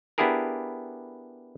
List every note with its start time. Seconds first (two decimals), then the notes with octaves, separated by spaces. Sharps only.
0.18 B3 D4 E4 G4 G#4 A#4